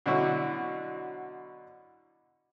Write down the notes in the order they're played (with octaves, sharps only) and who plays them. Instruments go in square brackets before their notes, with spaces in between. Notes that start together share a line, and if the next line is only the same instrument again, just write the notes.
[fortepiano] B2 D3 F#3 C#4 E4 F#4